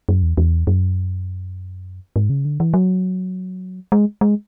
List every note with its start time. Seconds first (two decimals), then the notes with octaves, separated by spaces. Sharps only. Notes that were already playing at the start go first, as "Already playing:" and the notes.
0.09 F#2
0.23 E2
0.37 E2
0.67 F#2
2.16 G#2
2.30 C#3
2.45 D3
2.60 E3
2.74 F#3
3.92 G#3
4.21 G#3